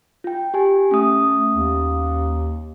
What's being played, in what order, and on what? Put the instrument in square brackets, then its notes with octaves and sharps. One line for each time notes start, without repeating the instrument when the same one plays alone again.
[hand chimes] F4 G5
G4 G#5
[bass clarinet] A3 [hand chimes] C#4 D#6
[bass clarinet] D#2